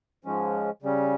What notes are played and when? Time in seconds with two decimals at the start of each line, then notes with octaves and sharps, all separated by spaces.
0.24 G#2 F3 G#3 C#4
0.82 C#3 G3 C#4